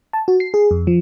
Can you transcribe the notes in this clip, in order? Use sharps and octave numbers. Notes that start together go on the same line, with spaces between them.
A5
F#4
C7
G#4
F2
F3